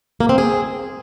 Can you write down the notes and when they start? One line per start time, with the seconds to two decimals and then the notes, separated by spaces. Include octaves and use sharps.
0.20 A#3
0.29 C4
0.38 G#4